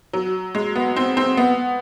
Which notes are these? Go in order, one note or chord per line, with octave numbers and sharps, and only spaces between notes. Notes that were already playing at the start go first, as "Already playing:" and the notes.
F#3
G#3
B3
C4
C4
B3